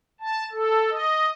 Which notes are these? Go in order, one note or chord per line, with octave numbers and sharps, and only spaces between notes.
A5
A4
D#5